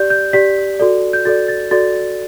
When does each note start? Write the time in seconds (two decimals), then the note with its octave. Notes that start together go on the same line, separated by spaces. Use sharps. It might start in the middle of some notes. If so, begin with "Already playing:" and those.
Already playing: G4 D5 G6
0.10 G6
0.33 G4 D5 B6
0.80 F#4 A4 D5
1.13 G6
1.25 F#4 A4 D5 A6
1.48 A6
1.71 F#4 A4 D5 A6